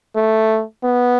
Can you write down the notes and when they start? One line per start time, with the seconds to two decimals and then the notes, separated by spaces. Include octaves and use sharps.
0.16 A3
0.84 B3